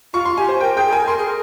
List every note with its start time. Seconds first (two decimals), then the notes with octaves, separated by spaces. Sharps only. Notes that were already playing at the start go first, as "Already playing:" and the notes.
0.14 F4 C#6
0.25 C6
0.37 G4 G#5
0.49 C5
0.60 A#4 G5
0.76 G#4 G5
0.87 G#4
0.92 A#4 G#5
1.07 A#4 C6
1.18 G#4
1.27 A#4